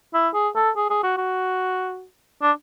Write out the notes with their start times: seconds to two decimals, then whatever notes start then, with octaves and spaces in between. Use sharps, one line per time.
0.14 E4
0.34 G#4
0.56 A4
0.77 G#4
0.90 G#4
1.03 F#4
1.18 F#4
2.42 D4